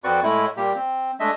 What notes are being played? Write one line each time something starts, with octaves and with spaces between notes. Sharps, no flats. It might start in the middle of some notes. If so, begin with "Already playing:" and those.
F2 C4 F#4 B4 D5 C#6
A2 G#3 A3 E4
A#2 G3 A#3 G4
C4
G#3 A3 D4 D#5 E5